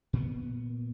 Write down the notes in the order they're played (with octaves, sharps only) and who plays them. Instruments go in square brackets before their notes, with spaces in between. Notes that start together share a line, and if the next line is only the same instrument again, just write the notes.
[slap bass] A#2 B3